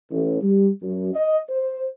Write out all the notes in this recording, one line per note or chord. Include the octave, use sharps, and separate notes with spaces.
A1
G3
F#2
D#5
C5